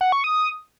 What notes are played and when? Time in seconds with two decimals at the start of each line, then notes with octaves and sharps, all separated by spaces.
0.01 F#5
0.12 C#6
0.24 D#6